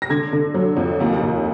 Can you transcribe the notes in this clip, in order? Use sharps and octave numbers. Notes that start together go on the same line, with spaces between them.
A#6
D3 G#6
D3
F#3
F2
D#2
D#2